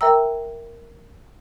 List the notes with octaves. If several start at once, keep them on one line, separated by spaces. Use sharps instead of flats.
A#4 E5 G5 A#5 E6